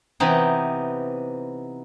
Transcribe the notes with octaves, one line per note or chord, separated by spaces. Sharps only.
C3 E3 B3 C4 D#4